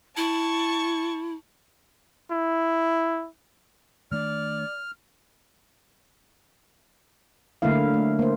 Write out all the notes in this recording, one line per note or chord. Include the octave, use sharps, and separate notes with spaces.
E4 A5 C#6
E4
D#3 A3 D4 D5 F6
D3 F#3 A3 A#3 E4 F5
A3
A#3 C5